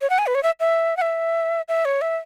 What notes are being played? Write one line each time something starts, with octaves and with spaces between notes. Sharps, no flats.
C#5
F#5
G#5
B4
C#5
E5
E5
F#5
E5
E5
C#5
E5